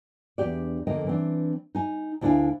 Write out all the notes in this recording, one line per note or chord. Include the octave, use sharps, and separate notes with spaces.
E2 D4 G4 D5
F2 D3 A#3 D#5 G5
E3 C4 D4
D#4 G#5
D2 D4 E4 E5 F5 G#5